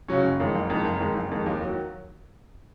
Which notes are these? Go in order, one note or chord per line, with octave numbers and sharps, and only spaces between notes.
C#3 F#3 C#4
F#1
F2 D#3 G#3
F#1
F2 D#3 G#3
F#1
F2 D#3 G#3
F#1
F2 D#3 G#3
D#2
D#3 F#3